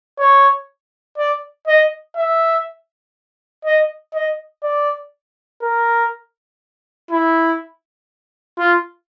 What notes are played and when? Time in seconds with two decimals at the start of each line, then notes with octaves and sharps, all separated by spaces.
0.19 C#5
1.18 D5
1.67 D#5
2.16 E5
3.65 D#5
4.14 D#5
4.63 D5
5.62 A#4
7.11 E4
8.58 F4